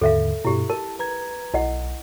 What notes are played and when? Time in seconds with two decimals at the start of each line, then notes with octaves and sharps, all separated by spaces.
0.01 D#2 G#2 D3 A4 E5 F5
0.45 G2 B2 E4 G4
0.70 A#4 A5
0.99 B4 A#5 G#6
1.54 B1 E4 D#5 F#5